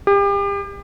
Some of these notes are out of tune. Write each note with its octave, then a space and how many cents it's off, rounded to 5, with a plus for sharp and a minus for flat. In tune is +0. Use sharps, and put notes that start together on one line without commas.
G4 +35